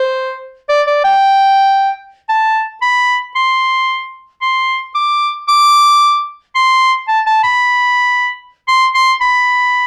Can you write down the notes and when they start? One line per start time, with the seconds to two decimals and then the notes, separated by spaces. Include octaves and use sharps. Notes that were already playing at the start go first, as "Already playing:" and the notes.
Already playing: C5
0.69 D5
0.87 D5
1.04 G5
2.29 A5
2.82 B5
3.35 C6
4.42 C6
4.95 D6
5.48 D6
6.55 C6
7.08 A5
7.26 A5
7.43 B5
8.68 C6
8.94 C6
9.21 B5